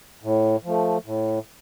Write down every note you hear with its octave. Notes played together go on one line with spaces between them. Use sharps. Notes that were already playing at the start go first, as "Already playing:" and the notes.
A2
F3 A3
A2